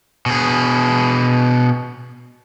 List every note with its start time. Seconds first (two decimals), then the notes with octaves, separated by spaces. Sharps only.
0.26 B2 G#4